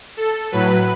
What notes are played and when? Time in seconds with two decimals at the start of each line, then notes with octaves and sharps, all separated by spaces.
0.17 A4
0.52 A2 F#3 B4